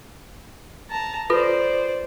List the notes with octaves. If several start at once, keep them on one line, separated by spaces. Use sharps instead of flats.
A5 A#5
F4 A4 B4 C5 D5